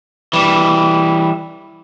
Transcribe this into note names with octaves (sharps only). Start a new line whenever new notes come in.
E3 G3